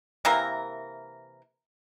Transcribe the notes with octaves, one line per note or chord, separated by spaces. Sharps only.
C3 E3 A#3 A#4